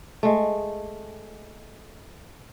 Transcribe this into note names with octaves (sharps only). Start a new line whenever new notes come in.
G#3 A3